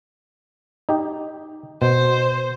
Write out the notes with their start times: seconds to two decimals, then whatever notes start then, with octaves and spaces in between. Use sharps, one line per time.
0.89 D#4 G4
1.82 B2 C5